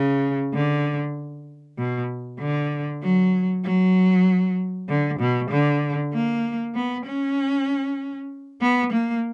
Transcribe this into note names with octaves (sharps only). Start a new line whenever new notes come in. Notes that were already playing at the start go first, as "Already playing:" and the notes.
Already playing: C#3
D3
B2
D3
F#3
F#3
D3
B2
D3
A#3
B3
C#4
B3
A#3